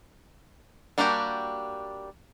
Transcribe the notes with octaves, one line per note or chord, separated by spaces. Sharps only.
G3 A#3 D4 F#4 G4